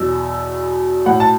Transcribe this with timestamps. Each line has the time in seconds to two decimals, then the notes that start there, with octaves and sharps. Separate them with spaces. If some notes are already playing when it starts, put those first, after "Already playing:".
Already playing: E2 B2 F#3 E6
1.06 A2 F#3 F#5
1.20 A5